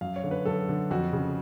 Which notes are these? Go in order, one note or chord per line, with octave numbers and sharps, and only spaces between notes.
F#2 F5
C#5
D3
B4
F#2 A4
D3
F2 F#4
C#3